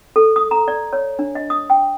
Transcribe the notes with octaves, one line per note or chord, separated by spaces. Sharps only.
A4
D#6
A#5
D5
C#5
D4
D#5
D#6
G5